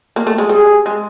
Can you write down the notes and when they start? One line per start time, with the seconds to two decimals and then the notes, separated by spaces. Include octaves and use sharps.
0.16 A#3
0.27 A3
0.38 G#3
0.49 G3 G#4
0.86 G#3